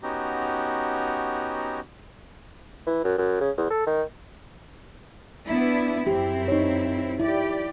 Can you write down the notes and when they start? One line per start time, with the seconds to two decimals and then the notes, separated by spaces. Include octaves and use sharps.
0.03 B3 C#4 D#4 F#4 G4 A#5
2.87 E3
3.04 F#2
3.18 F#2
3.41 C#3
3.57 E2
3.71 A4
3.87 D#3
5.45 B3 D4 E4
6.07 F#2 C4 E4 G4
6.48 D#4 C#5
7.20 E4 G4 D5